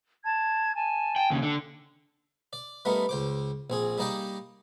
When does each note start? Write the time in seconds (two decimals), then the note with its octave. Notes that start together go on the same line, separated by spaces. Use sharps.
0.23 A5 G#6
0.74 G#5 A5
1.16 G5
1.30 D#2 C#3
1.43 D3
2.53 D5
2.85 G3 A3 B3 D#4 A#4
3.09 C#2 C5 D6
3.70 A#1 C4 G#4
3.98 G3 A#3 D#4 D5 D#5 G5